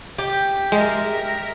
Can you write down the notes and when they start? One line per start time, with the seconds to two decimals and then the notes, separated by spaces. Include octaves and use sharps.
0.18 G4
0.72 G#3 A#4 E5